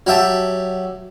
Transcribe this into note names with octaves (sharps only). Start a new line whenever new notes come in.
F#3 G4 E5 A5